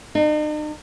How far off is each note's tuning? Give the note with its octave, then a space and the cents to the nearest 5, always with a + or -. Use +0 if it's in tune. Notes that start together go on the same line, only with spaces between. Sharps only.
D#4 -45